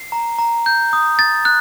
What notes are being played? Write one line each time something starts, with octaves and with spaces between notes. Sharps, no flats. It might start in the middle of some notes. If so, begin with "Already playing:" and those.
Already playing: C7
A#5
A#5
G6
D#6
A6
F#6